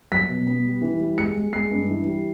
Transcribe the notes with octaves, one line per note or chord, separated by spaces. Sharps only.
F#3 B6
B2
B3
G3
E3
G3
G#3 C#7
G#3
G#3 C7
G2
E3
G3